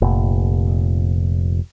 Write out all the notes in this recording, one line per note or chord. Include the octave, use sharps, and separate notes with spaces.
F1 A#2